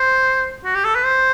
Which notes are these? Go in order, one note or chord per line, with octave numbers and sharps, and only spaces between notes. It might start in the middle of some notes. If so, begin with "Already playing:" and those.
Already playing: C5
F#4
G4
A4
B4
C5